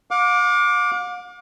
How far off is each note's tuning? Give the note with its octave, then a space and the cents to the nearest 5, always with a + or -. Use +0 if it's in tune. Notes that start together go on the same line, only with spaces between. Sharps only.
F5 +45 D6 +0